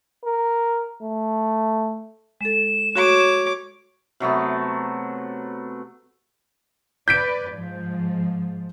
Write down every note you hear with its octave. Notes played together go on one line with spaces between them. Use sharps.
A#4
A3
G#3 A4 E7
F#4 C#5 D6
C3 F#3 A3 B3
B4 D5 G6 B6 D7
G#2 F3